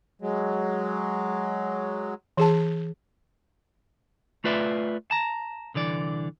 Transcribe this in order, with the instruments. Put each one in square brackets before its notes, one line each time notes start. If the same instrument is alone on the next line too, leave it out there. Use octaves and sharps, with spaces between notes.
[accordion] F#3 G#3
[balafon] E3 G#4 A5
[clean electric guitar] A3 F4 B4 D5 E5
A5 A#5
C2 D3 E3 D5